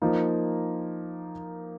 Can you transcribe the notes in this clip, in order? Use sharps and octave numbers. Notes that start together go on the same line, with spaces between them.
F3 A#3 D#4